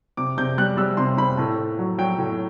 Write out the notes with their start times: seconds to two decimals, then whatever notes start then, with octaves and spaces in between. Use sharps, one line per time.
0.17 C3 D6
0.38 C3 G6
0.58 G3 F#6
0.77 G3 E6
0.97 C3 C6
1.17 C3 B5
1.37 A2 A5
1.58 A2
1.79 F#3
1.98 F#3 G5
2.18 A2